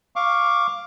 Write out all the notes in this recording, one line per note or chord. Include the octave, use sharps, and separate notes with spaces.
F5 C#6 D6